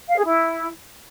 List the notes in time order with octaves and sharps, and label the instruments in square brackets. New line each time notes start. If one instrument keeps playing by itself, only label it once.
[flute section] F5
G#4
E4